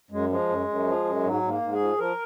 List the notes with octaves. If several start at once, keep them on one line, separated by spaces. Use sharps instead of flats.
F#2 G#3
F3 G#3
F#2
F#2
F3
F#2
G#2 F#3
G#2
A#3
G#2
G#4
F3
F3 A#4